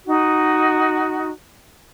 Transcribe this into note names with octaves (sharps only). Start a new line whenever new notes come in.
D#4 F#4